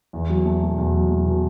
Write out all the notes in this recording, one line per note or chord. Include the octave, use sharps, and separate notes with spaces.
E2
F#3
A3
B2
E2
F#3
A3
B2